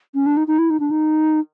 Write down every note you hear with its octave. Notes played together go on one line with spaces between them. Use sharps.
C#4
D4
D#4
D#4
E4
D#4
D4
D#4